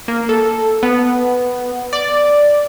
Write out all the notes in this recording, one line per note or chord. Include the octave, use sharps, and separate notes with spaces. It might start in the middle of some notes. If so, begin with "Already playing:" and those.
A#3
A4
B3
D5